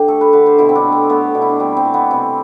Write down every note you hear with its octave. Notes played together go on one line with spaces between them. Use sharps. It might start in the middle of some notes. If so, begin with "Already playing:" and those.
Already playing: D3 G4
A3 A4
B4
D3 B4
C5
B2 E4
C4
D4
A3
C4
A3 B3
B2 D4
E4
D4
G3 C4
C4
E3
B3
C3 C4